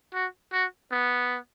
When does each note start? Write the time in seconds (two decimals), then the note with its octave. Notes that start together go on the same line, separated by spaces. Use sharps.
0.14 F#4
0.53 F#4
0.92 B3